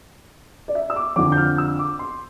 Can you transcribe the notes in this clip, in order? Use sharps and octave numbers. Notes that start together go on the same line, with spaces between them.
D5
E5
E6
D6
F2 D3 F3 D6
G6
F6
E6
D6
C6